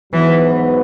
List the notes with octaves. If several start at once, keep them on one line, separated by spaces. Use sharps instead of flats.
G#2 E3 F#3 B3 F#4 B4